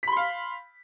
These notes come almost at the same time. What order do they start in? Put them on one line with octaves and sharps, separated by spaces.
B6 B5 C6 F5